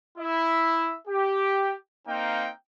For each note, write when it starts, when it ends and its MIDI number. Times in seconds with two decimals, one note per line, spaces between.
0.18 0.95 64
0.18 0.95 76
1.08 1.73 67
2.06 2.49 58
2.06 2.49 60
2.06 2.49 63
2.06 2.49 77
2.06 2.49 79